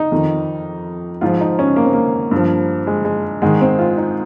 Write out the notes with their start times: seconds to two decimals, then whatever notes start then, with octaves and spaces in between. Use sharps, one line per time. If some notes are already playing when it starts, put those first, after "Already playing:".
Already playing: D#4
0.12 F2 D#3
1.21 G#2 F3 F4
1.41 D#4
1.59 C#4
1.76 A#3
1.85 C4
1.93 A#3
2.31 G2 F3
2.87 G#3
3.05 G#3
3.42 G#2 D#3 G#3
3.61 C4
3.79 F4
3.98 D#4